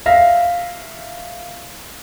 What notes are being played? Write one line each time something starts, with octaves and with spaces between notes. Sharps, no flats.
E5 F5 A#6